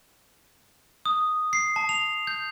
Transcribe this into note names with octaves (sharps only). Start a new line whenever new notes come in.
D#6
C7
A5
F7
G6